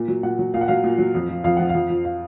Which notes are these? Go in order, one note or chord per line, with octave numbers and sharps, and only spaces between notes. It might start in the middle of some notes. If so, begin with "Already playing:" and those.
Already playing: A#2
F#3
A#2 F#5
F#3
A#2 F5
F#5
F#3 F5
A#2
F#3
F2
F3
F2 F5
F3 F#5
F5
F2
F3
F5